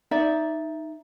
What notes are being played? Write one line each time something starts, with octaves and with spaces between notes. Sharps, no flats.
D#4 D5 E5